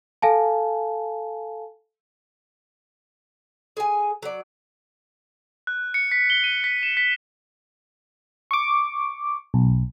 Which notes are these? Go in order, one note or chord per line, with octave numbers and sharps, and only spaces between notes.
A4 F5 G#5 A5
G#4 G#5
F#3 D5
F#6
C#7
B6
G7
D#7
B6
E7
B6
C#6 D6
B1